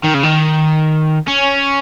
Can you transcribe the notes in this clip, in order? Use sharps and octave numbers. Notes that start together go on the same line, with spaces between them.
D#3
C#3
D#3
C#4